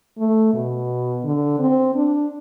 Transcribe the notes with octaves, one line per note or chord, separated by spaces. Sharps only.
A3
B2
D3
C4
D4